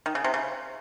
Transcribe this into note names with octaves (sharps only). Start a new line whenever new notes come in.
D#3
C#3
C3
C#3